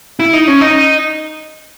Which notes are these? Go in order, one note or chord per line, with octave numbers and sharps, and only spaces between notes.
E4
D#4
C#4
D#4